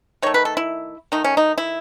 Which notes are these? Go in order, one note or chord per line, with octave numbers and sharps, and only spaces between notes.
D#3 A3 C#5
B4
A4
E4
D#3 A3 D#4
C#4
D#4
E4